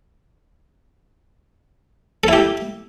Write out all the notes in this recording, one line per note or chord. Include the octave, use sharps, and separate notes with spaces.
E4 G4 A4